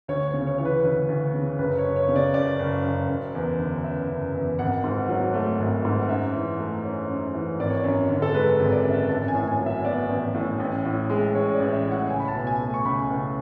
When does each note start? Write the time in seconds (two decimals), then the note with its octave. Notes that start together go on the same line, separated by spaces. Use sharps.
0.08 D2 C#5
0.28 C#5
0.34 C#3
0.47 C#5
0.58 E3 C#5
0.65 B4
0.84 D2 B4
1.08 D2
1.34 C#3
1.58 F#1 B4
1.78 C#5
1.84 F#2
1.96 C#5
2.08 C#3
2.16 D5
2.34 F#1 D5
2.59 F#1
2.84 F#2
3.09 F#1
3.35 E2
3.59 D3
3.84 F#1 E5
4.09 F#1
4.34 E2
4.59 G#1 F#5
4.84 G#2
5.09 F#3
5.34 A3
5.59 G#1
5.85 G#2
6.02 F#5
6.09 F#2 E5
6.35 E3
6.59 A3
6.84 C#4
7.09 F#2
7.34 E3
7.59 G#1 D5
7.70 C#5
7.80 F#2 D5
8.10 D3
8.22 A4
8.34 G#3 B4
8.60 G#1
8.72 D5
8.85 F#2
8.91 E5
9.09 A1 A5
9.28 G#5
9.34 A2
9.48 G#5
9.60 F#3
9.66 E5
9.85 B3 D5
10.09 A1
10.34 A2
10.60 A1
10.85 A2
11.10 G#3
11.34 A1 C#5
11.54 D5
11.60 A1
11.73 E5
11.85 A2
11.91 F#5
12.10 C#2 G#5
12.20 B5
12.28 A5
12.34 B2
12.47 G#5
12.59 A3
12.74 C#6
12.85 C#2 B5
13.10 C#2